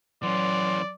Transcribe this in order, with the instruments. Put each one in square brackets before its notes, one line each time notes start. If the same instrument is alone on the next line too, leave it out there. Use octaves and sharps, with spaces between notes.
[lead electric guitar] E3 C#4 [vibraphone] F#3 [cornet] D5 [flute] C6